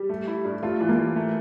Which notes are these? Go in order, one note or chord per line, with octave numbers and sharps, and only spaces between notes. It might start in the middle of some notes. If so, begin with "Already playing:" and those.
Already playing: G3
A3
E4
G2
A3 F4
E3
A#3
E3
A3